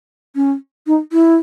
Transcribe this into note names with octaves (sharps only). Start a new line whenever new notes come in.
C#4
D#4
E4